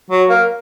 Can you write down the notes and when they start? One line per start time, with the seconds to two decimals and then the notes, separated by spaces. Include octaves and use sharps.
0.11 F#3
0.29 A#3